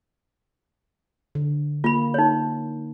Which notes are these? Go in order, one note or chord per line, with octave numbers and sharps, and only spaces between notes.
D3
A#3 F4 B5
D#4 C#5